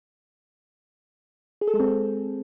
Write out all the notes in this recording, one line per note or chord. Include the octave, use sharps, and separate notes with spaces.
G#4
A4
G#3
C4